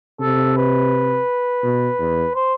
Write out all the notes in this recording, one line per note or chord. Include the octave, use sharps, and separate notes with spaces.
C3 A4
B4
B2
E2
C5